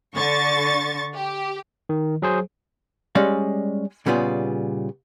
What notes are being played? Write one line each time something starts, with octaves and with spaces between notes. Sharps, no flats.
D3 C#6 A6
G4
D#3
F#3 G#4 C5
G3 G#3 C#4 D5 F5
A#2 C#3 G3 B3 F4 G#4